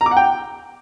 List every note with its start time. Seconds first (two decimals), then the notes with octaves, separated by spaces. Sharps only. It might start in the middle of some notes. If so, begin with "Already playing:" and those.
0.01 A#5
0.06 D6
0.11 F#5
0.17 G5